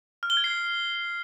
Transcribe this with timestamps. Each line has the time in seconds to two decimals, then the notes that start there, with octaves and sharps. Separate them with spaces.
0.23 F6
0.30 G7
0.37 G#6
0.44 C7